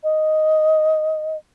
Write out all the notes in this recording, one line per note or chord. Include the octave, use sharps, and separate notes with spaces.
D#5